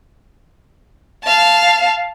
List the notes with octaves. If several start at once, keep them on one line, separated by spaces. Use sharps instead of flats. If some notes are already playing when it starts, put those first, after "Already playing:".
F5 A5